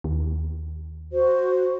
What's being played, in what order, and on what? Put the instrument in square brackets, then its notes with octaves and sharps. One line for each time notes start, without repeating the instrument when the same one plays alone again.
[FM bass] D#2
[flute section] F#4 C5